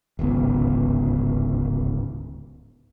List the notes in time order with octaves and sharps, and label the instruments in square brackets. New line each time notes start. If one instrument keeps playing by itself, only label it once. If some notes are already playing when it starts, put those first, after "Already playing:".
[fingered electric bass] D1 G#1 C#2 B3